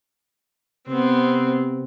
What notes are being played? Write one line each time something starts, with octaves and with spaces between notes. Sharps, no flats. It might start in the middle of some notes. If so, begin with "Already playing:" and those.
C3 B3 C4